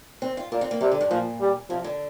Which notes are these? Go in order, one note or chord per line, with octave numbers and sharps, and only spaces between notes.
C4
F4
A#2 D4
C4
A#3
C3 G3
D3
G2
A#2 F3
G3
C3 F3
D3